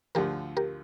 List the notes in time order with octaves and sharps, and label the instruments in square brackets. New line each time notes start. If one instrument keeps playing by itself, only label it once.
[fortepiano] D2 D3 F3 [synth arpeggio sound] G4 A#4
[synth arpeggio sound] G4 A#4